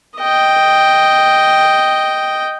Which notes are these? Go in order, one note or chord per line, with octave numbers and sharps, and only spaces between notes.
D#5 G5